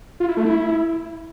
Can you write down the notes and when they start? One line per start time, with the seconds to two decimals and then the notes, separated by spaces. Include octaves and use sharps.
0.20 F4
0.29 E4
0.37 A3
0.45 E4